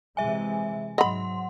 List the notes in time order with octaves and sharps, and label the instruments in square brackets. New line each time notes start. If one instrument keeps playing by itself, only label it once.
[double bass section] C3 E3 G#3 [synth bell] E5 G#5
[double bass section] G#2 F#3 [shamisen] D#5 B5 [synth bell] F#5 C6